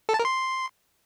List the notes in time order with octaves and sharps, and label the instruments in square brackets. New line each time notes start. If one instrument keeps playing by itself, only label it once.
[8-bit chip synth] A4
A5
A#4
C6